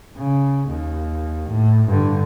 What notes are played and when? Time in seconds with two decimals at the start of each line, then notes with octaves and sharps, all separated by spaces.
0.18 C#3
0.68 D#2
1.48 A2
1.88 G2 D3